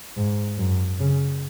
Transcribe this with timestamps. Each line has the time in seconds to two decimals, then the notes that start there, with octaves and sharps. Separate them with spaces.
0.17 G#2
0.58 F#2
1.00 C#3